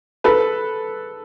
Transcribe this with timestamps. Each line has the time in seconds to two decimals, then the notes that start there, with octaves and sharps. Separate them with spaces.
0.24 A4 B4